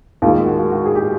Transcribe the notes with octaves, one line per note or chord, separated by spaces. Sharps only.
D#2 D#3 G#3 F4
F#4
F#4
G#4
G4